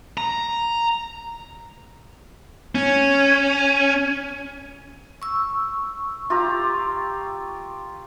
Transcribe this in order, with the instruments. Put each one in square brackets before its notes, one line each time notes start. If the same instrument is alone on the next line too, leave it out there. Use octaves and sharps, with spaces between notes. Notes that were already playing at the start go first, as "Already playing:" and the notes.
[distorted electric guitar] A#5
[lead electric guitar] C#4
[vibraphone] C#6 E6
[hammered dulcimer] F4 G4 A#5